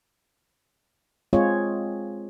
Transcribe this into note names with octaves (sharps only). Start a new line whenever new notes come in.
G#3 C4 F4 G#4 C#5